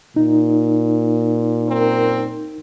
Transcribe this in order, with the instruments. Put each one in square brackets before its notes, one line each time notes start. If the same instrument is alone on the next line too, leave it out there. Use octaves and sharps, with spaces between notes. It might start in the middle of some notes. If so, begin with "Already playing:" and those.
[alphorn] A#2 [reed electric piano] D#4
[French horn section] F#2 C4 A#4